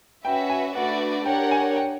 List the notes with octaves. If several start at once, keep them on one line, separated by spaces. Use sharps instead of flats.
C#4 F#4 B4 E5 G5
G#5
A3 D4 F#4 B4 D5 F#5
D4 G4 A#4 C#5 F#5 G5
G#5
G5